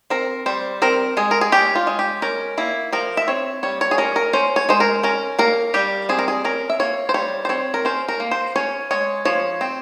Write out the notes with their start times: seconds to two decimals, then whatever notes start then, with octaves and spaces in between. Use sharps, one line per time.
0.10 C4 A#4
0.46 G3 C5
0.82 C4 A#4
1.17 G#3 G#4
1.31 A#4
1.41 G#4
1.52 C#4 G4
1.75 F4
1.87 G#3
1.99 G4
2.22 C#4 A#4
2.58 A#3 E4
2.92 F3 A#4
3.17 E5
3.27 C4 C#5
3.63 G3 C#5
3.81 C#5
3.91 G#4
3.98 C#4 A#4
4.16 A#4
4.33 C#4 C5
4.56 C#5
4.69 G#3 C5
4.80 A#4
5.03 C#4 A#4
5.39 A#3 A#4
5.74 G3 G4
6.09 C4 G#4
6.19 A#4
6.28 G#4
6.44 C#4 A#4
6.70 E5
6.80 A#3 C#5
7.09 C5
7.14 G3 C#5
7.45 C5
7.49 C4 C#5
7.74 A#4
7.85 C#4 C5
8.08 A#4
8.20 A#3
8.31 C5
8.56 C#4 C#5
8.91 G#3 C#5
9.25 F3 C#5
9.61 C4